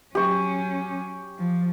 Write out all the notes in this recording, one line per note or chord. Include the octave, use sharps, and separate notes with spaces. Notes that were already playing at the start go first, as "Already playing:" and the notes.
F#3 C#4 G4 C#6
F3